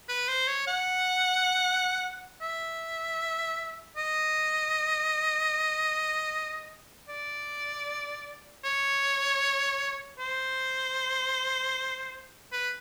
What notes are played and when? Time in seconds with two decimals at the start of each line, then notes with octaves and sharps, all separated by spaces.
0.09 B4
0.28 C5
0.48 C#5
0.67 F#5
2.42 E5
3.97 D#5
7.09 D5
8.64 C#5
10.19 C5
12.52 B4